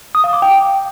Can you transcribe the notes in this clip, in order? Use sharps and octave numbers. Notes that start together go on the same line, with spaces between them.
D#6
F5
D6
G5